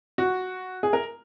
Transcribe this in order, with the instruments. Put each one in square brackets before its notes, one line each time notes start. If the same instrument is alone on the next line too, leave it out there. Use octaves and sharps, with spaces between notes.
[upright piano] F#4
G#4
A#4